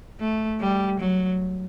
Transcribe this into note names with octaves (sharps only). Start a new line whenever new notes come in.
A3
G3
F#3